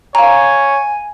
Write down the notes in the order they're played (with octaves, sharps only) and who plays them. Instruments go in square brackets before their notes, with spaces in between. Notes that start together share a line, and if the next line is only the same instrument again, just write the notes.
[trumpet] C#5 [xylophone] F5 A#5 [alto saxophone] G#5